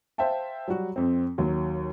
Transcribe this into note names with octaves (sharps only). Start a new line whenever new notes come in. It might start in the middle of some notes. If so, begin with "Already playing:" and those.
C5 E5 F5 G5 A5
F#3 G3 F#4
F2 C4
D#2 F#3